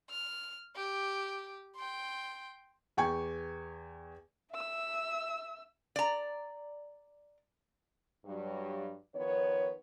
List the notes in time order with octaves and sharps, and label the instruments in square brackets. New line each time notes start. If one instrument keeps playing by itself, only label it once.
[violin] F6
G4
G5 C6
[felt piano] E2 G5 G#5 C#6 G#6
[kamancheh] E5 E6
[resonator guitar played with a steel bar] D5 A#5
[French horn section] G2 F#3 G3
D#3 F3 B3 C#5